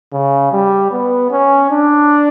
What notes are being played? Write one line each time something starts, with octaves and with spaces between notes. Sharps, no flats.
C#3
G3
B3
C#4
D4